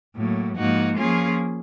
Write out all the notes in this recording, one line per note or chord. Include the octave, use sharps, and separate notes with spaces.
A2 F#3 A#3
G#2 F3 A#3 D#4 F#4
F3 A#3 C#4 F4 G#4